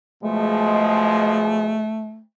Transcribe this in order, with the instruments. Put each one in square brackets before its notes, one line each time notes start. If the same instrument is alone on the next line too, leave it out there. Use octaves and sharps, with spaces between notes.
[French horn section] B2 F3 G#3 [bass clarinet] A3